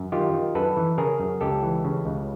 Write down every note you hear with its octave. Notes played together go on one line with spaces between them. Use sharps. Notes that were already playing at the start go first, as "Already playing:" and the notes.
Already playing: F#2
D#3 F4 G4
D#3
F#2 A4 B4
E3
C#3 G#4 A#4
F#2
C#2 G4 A4
E3
C#3
C#2